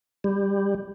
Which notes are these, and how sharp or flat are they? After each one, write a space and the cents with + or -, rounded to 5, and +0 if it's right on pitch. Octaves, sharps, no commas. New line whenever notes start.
G3 +15